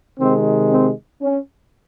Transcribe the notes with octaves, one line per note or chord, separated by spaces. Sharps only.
C3 D#3 G#3 C4
C4
C#4